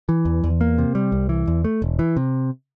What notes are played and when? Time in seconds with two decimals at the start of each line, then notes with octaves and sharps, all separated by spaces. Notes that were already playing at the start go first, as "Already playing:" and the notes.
0.09 E3
0.25 E2
0.44 E2
0.61 A#3
0.78 C3
0.95 G3
1.12 C2
1.29 E3
1.47 E2
1.64 A3
1.82 E1
1.99 E3
2.17 C3